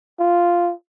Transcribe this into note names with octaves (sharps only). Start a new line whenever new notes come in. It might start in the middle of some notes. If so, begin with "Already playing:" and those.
F4